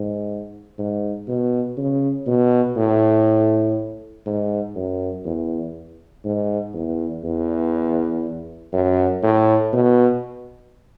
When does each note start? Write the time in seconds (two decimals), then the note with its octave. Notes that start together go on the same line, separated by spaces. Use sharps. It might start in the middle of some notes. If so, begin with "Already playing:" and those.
Already playing: G#2
0.78 G#2
1.28 B2
1.77 C#3
2.27 B2
2.76 A2
4.26 G#2
4.75 F#2
5.25 E2
6.25 G#2
6.74 E2
7.24 E2
8.73 F#2
9.23 A2
9.73 B2